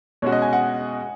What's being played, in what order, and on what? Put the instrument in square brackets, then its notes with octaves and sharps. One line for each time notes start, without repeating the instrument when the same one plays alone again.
[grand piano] B2 G#3 C#4 F#4 [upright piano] C#5
[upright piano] D#5
G#5
F#5